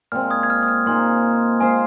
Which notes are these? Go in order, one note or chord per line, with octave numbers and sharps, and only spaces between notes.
A#2 G#3 C4 F6
D#6 G#6
G#6
F6
D#6
F6
A#2 G#3 D#4 C5 C6
G#3 F4 C5 G#5